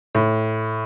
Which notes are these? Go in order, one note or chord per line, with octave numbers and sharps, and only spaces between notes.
A2